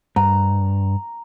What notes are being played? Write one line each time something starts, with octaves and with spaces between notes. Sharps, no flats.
G2 A#5